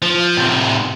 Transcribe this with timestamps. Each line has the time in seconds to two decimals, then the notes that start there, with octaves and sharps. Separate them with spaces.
0.02 F3
0.37 A2 C3